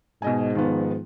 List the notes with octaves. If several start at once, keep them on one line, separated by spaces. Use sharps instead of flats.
G#2 B2 D#5 G#5
D#3 F3 B3